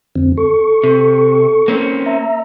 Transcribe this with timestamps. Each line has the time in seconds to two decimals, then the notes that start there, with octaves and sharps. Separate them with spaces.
0.16 F2 D3 C4
0.37 A4 C#6
0.83 C3
1.68 A#3 C4 C#4
2.06 E5 A#5